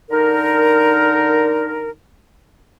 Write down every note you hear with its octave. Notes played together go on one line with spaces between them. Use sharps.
D3 D#4 A#4